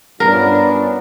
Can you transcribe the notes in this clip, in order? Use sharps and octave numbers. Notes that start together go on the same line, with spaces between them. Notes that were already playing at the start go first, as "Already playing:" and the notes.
G2 B3 C#4 D4 F4 A#4